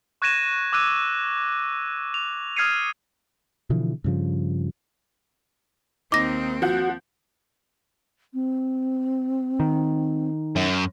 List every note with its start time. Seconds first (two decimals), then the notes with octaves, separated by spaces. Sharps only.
0.22 C#6 F#6 G#6 A#6 D#7 E7
0.73 D6 E6 F#6 D#7
2.14 F7
2.57 D#6 F6 G#6 C7 C#7 D#7
3.70 B2 D3 E3 F3
4.04 G2 C#3 F3
6.12 D#2 C4 D#4 D6 A#6
6.62 F3 F#4 F#5 G6
8.34 C4
9.60 D#3
10.56 F#2